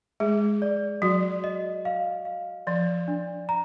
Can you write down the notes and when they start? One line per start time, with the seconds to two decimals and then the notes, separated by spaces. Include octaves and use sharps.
0.20 G#3 G#4
0.62 D5
1.02 F#3 F#4
1.44 D#5
1.85 F5
2.25 F5
2.67 F3 D5
3.08 D4
3.49 A#5